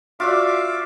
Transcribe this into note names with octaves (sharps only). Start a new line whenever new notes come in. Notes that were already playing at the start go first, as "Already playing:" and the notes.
F4 F#4 D5 E5 F5 D6